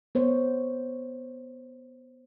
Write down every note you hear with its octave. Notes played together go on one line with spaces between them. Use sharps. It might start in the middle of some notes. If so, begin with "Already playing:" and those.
B3 C5 C#5